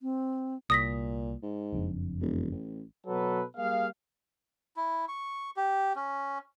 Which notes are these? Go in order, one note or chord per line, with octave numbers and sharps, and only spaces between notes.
C4
C2 A#2 D#6 A#6 B6
G#2
F#1 F2 D4
E1
A1
B2 F#3 A4 B4
G3 A#3 G#4 F5
E4
C#6
G4
C#4